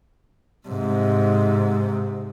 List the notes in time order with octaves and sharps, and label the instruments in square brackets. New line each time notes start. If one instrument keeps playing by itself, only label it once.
[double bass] G#2 C3